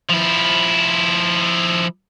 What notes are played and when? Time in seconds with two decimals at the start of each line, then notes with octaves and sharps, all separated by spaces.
0.09 F3 E4